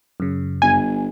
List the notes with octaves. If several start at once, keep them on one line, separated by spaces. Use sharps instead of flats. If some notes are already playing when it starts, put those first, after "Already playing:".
F#2 C#3
G1 G#5